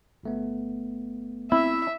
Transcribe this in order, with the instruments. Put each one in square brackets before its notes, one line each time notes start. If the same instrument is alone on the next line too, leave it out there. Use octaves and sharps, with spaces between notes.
[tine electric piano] G1 A3 B3
[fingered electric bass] C4 [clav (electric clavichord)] E4 [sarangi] E5